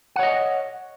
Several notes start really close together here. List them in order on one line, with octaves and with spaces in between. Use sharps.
F#5 C#5 D#5